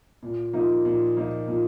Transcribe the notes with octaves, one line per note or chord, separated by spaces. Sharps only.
A#2
F3 A#3 D#4
A#2
F3 A#3 D#4
A#2